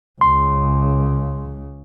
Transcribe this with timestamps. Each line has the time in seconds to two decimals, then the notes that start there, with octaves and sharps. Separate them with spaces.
0.21 C#2 C#3 C6